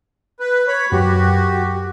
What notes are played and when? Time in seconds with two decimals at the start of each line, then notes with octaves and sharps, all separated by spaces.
0.40 B4
0.67 C#5 B5
0.92 F#2 F#4 G4